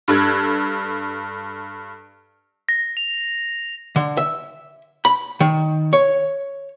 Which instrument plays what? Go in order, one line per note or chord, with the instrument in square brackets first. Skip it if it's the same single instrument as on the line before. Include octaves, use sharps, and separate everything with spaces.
[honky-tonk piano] G2 A4 F#6 G#6
[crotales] A#6
F7
[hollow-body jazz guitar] D3
E5
B5
D#3
C#5